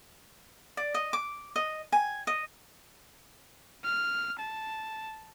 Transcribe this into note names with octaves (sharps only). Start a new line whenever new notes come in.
D5
D#5
D6
D#5
G#5
D#5
F6
A5